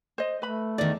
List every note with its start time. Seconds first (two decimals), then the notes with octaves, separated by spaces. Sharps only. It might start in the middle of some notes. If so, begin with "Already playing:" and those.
0.18 C5 D#5
0.42 A3 B4 B5
0.78 E2 D#3 D5